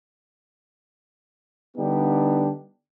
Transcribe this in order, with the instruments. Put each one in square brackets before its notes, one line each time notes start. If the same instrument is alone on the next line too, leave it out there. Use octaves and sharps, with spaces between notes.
[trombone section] D3 G3 B3 D4 D#4 G4